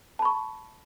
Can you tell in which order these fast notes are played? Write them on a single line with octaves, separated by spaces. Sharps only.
A5 B5 C#6